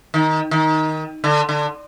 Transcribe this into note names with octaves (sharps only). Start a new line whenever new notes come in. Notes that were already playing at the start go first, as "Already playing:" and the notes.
D#3
D#3
D3
D3